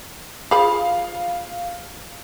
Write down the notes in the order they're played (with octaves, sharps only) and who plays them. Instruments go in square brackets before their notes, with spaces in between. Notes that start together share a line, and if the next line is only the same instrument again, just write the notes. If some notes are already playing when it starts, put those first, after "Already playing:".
[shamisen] F3 G#4 B5 [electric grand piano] F5